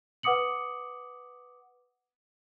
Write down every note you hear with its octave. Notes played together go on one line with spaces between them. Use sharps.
B4 F#5 D6 D#6 C#7 F#7